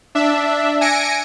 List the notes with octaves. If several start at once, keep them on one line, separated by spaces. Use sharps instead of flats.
D4 E5
G#5 A#6 C#7 D7